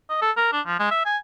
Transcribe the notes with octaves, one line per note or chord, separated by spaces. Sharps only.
D#5
A4
A#4
D4
F3
G#3
E5
G#5